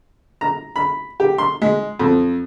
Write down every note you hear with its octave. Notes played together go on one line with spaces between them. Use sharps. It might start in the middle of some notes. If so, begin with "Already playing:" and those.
A#5
B5
G4
C6
G#3
F2